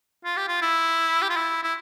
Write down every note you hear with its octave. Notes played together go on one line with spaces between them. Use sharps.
F4
G4
F4
E4
G4
F4
E4
E4